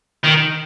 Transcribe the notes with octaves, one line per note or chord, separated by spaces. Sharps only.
D#3